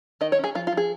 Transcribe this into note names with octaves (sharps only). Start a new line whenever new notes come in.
D#3 D#5
C#5
C#4
G#4
F3 F4
F4
F3 G#4